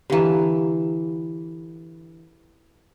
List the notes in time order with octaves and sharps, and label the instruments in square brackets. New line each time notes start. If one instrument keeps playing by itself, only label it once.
[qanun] D3 E3 [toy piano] G4 F5 A#5